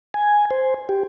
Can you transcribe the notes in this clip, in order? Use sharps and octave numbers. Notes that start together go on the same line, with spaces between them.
G#5
C5
G4